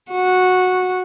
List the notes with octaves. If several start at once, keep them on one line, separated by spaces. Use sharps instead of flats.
F#4